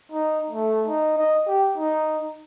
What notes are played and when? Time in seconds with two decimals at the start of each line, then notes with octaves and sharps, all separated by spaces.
0.12 D#4
0.50 A3
0.87 D#4
1.18 D#5
1.47 G4
1.78 D#4